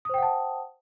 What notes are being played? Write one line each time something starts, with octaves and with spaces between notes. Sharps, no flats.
C5 F#5 G5 A5 D#6